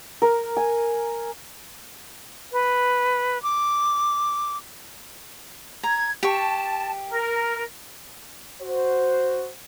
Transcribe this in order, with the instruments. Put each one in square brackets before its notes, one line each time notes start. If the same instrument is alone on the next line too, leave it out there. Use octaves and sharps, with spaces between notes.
[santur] A#4
G#5
[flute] B4
D6
[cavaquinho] A#5 [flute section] G#6
[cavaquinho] G4 C#6 [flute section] A5
[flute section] A#4
[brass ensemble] F#4 C5